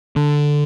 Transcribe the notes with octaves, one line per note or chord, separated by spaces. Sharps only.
D3